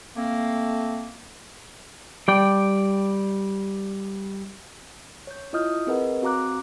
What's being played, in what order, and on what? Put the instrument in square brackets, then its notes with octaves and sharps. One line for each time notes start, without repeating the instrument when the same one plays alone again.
[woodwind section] A3 A#3 C4
[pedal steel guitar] G3 D5 G5
[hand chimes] C#5 G6
E4 F4 D#5 D#6 F6 G6
C4 G#4 A#4 B4 D#5 F#5
C4 F#4 F5 A#5 D6 F#6